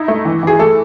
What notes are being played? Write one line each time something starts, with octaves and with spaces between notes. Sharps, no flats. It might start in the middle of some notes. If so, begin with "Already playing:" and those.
Already playing: D#4 E4
A3
E3
E3 G#4
A3 A4